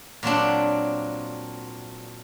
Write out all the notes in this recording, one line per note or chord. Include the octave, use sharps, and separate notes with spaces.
A#2 F#3 C4 D4